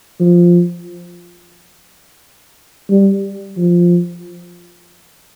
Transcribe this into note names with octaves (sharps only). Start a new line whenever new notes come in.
F3
G3
F3